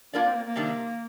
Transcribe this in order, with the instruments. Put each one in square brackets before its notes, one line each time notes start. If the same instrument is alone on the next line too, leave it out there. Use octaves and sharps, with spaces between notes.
[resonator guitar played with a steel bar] A#3 F4 A#4 D5 [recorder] D4
[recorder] C4
A#3
A#3
[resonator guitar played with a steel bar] C3 D#3 G3 D4